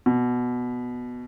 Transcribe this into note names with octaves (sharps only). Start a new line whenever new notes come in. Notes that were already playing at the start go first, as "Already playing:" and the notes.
B2